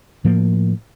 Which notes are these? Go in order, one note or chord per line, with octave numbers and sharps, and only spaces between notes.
A2 F3 A#3